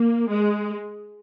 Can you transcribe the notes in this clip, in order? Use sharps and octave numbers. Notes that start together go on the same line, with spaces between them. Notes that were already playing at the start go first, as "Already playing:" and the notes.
Already playing: A#3
G#3